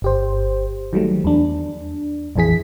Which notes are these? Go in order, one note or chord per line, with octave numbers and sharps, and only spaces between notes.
G1 G4 C5
D#3 F#3 G3 A3
E2 D4
A#1 F2 E3 G#4 B6